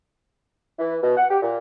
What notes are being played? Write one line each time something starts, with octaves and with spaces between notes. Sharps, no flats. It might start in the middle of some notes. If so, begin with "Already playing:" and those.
E3
B2
F#5
G4
A#2